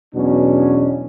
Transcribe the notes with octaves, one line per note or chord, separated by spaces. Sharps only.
E2 B2 F#3 C#4 D4